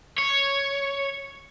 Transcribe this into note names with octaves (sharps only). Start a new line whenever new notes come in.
C#5